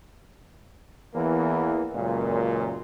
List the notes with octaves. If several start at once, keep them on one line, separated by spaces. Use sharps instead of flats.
E2 E3 A#3 B3
C#2 F#2 A#2